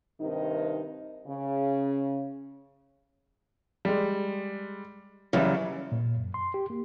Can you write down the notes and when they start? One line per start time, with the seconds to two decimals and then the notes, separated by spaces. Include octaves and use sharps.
0.21 G2 C3 D#3 D#4
1.28 C#3
3.85 G3 G#3
5.33 F#2 C#3 E3 G3
5.92 A#2
6.16 F#2
6.34 C6
6.54 G4
6.70 A#3